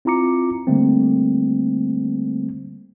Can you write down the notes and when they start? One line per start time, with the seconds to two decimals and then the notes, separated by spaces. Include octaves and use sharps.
0.05 C4 E4 F4 A#5 D6 C#7
0.67 D3 G3 A3 A#3 C4